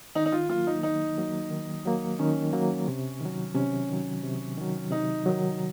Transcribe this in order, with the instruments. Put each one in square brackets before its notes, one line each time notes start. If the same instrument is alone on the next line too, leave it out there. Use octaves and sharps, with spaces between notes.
[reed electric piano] D#3 [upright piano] D#4
[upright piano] D#4
F4
[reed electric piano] F#3 A#3 [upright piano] F4
[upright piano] D#4
[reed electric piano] D#3 [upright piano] D#4
[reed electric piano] F#3 A#3
D#3
F#3 A#3
[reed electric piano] D#3 [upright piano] C#4
[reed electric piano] F#3 A#3
C3
D#3 F#3
[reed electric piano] C3 [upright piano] C#4
[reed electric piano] D#3 F#3
C3
D#3 F#3
[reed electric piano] C3 [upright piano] D#4
[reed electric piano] D#3 F#3